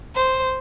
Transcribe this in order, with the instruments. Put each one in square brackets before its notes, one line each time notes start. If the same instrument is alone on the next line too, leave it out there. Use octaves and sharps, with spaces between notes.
[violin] C5